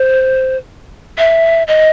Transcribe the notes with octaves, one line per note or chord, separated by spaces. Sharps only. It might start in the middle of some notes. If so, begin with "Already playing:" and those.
Already playing: C5
E5
D#5